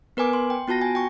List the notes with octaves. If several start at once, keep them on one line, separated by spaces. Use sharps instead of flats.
B3 A#4 B4 G#5 D6
C6
G5
B3 F4 F#4 A5 A#6
G#5
G5 C#6